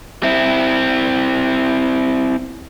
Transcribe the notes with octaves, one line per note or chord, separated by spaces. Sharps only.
C4 E4